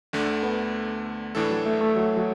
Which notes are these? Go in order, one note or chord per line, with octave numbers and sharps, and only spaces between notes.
D2 D3 A3 D4
B3
A2 E3 A3 D4 A4
F#3
A3
A3
F#3
F#3